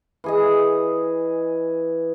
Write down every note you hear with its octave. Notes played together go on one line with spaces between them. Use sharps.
E3 G#4 D#5